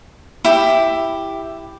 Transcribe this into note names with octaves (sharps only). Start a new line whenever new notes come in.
E4 G4